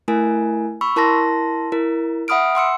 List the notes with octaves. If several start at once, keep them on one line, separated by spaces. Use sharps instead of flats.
A3 E4 A#4 G#5
B5 C#6 E6
E4 A#4 A5 C6 A#6
E4 A#4
E5 F#5 B5 D#6 F6 D7
F#5 C6 E6 C#7